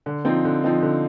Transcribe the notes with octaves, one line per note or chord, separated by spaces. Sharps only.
D3
F3 C4 D#4
D3
F3 C4 D#4
D3